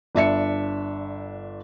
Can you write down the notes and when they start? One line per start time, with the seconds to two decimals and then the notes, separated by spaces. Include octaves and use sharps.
0.15 G1 D4 E5 C#7